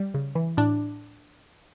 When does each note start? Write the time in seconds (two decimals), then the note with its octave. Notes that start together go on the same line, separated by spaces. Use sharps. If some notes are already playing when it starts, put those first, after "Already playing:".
Already playing: G3
0.14 C#3
0.35 E3
0.57 A2 D4